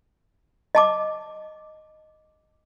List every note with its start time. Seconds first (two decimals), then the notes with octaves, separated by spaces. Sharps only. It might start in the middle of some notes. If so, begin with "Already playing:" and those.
0.75 D#5 A5 D6